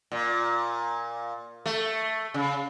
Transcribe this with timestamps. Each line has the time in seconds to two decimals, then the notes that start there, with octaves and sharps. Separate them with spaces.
0.12 A#2
1.66 A3
2.34 C#3